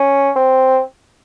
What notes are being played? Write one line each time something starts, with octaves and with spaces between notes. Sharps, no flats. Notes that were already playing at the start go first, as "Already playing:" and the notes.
Already playing: C#4
C4